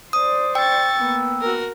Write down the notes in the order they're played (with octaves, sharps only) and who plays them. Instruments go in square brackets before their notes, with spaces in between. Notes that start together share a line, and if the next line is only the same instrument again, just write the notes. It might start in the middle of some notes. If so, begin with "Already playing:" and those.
[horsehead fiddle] C5 D5 [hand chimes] D#6
[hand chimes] G5 [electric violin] C#6 A6 [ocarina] E6
[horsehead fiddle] A#3 B3
[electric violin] F#4 A#4